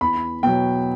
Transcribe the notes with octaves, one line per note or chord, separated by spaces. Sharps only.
E2 B5
B2 F#3 G5